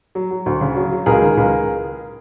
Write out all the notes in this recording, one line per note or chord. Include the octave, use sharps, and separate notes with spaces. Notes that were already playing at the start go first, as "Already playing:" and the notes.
F#3
F#3
D2
C#3
F#3
F#3
C#2 G#4 A#4
D#3
C#2